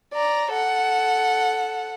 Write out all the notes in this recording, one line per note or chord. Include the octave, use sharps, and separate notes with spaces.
D5 A#5
A4 F#5